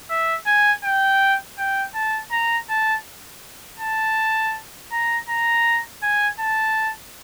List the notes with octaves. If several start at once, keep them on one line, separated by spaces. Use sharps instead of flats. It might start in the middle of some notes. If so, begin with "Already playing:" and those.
E5
G#5
G5
G5
A5
A#5
A5
A5
A#5
A#5
G#5
A5